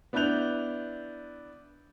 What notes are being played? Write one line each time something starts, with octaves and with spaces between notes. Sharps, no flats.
B3 D4 E4 F#6 G6 F7